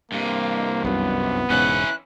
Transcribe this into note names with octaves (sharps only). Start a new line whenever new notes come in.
G2 C3 A#3
C2 F#2 B3
E1 G#2 C#3 C#4 E4 F#6